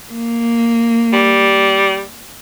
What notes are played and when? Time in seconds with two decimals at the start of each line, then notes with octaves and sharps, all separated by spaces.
0.12 A#3
1.13 G3